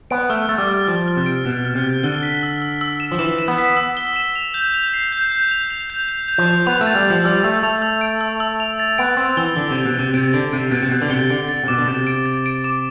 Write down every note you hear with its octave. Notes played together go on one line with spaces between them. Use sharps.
B3 D7
A3 F6
A3 A6
G3
F6
F3 F6
F6
C3
D7
B2 A6
F6
C3
F6
D3 G7
B6
E6
E6
E6
E7
F3
E3 E7
E7
B3
B6
E6
G7
E7
F7
G6
F7
C7
G6
G6
F7
F7
G6
F7
G6
F3
F7
B3 F7
A3
A6
G3
F3 A6
G3 E6
A3 A6
A3 F7
E6
D7
E6
E6
F7
A6
B3 D7
C4 A6
E3 G7
D3 G7
C3 G7
B2
A6
C3
C3 D7
D3 D7
C3 D7
B2 A6
C3
B2 A6
D3
C3 G7
D3 D7
A6
C3
B2 D6
D3
C3 A6
D7
A6
D7
D6